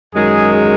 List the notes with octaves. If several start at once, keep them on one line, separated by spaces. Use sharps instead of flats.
F#2 D#3 G#3 G#4